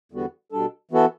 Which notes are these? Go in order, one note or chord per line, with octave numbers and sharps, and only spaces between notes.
E2 D3 G3 B3 F#4
B2 G3 D4 A4
E3 B3 F#4 A4